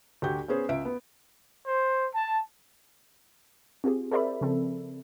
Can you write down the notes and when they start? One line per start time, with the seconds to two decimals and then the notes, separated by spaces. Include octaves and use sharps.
0.22 D2 F#4 G4 G6
0.48 B3 C#4 G#4 C5
0.69 C#2 E5 D7
0.85 B3
1.66 C5
2.14 A5
3.84 C4 F4 G4 G#4
4.12 G#4 A#4 C5 D5 E5 B5
4.41 C#3 F3 C4 A4